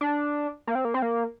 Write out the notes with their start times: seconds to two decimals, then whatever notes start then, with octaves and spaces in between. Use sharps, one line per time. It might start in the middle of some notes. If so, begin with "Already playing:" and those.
0.01 D4
0.67 A#3
0.75 C4
0.85 A#3
0.94 C4
1.02 A#3